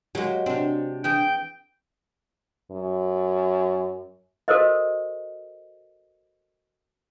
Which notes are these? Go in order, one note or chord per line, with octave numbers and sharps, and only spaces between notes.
F#3 G#3 A#3 F#4 G4
C3 C4 D4
E3 G#4 G5
F#2
F#4 A4 A#4 C5 D#5